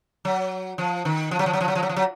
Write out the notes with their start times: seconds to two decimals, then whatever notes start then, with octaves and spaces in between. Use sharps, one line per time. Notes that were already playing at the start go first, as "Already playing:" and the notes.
0.25 F#3
0.78 F3
1.05 D#3
1.31 F3
1.39 F#3
1.46 F3
1.53 F#3
1.61 F3
1.68 F#3
1.75 F3
1.83 F#3
1.89 F3
1.96 F#3